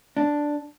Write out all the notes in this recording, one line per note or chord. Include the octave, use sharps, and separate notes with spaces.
D4